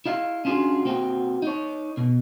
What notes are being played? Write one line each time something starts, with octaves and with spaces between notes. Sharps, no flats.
E4 D#5 F5
C#4 D4 F4 F#4 G#4
A#3 C4 F#4 G5
D#4 C#5
B2